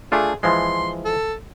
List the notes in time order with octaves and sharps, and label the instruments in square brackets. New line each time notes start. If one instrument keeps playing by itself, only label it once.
[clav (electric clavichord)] A3 D4 F4 [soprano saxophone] G#4
[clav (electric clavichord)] E3 F3 G#3 [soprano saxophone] C6
[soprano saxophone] A4